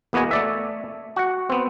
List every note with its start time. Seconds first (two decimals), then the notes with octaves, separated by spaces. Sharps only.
0.13 E2 A#3 B3 F#4 D#5 G#5
0.31 A3 D5 E5
1.16 F#4 F#5
1.50 B3 C4